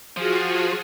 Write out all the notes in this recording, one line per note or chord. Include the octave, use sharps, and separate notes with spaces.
F3 F4 F#4 G#4